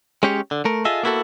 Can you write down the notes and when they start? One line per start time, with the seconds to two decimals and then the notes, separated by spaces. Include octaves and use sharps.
0.23 G#3 C#4 G4 C#5
0.51 D3
0.65 A3 A#4
0.85 F4 G#4 A4 D#5 E5
1.03 A#3 B3 E4 F#4 G4 A4